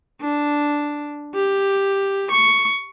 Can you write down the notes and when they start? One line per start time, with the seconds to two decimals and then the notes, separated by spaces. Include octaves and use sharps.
0.21 D4
1.35 G4
2.31 C#6